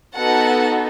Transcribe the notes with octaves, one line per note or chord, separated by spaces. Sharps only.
B3 D#4 F#4 A4 F#5